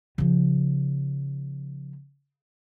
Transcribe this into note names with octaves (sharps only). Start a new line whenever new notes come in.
C#3 F3